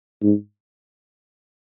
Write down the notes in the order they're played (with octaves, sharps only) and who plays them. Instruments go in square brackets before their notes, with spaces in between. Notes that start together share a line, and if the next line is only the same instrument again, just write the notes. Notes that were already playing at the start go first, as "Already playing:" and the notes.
[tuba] G#2